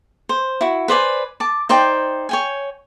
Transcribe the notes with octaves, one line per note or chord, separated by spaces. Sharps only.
C5
E4 F#4
B4 C5 D5 G#5
A5 D6
D#4 C5 D5 G5
C#5 G5 G#5